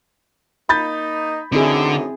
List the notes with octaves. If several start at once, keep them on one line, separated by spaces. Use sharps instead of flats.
A#3 D#4 B5 G6 A6
F#2 D3 A3 C4 D#4 E4 G#4